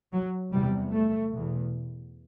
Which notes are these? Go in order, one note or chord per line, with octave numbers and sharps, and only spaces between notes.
F#3
E2 C3 G3
A3
E2 B2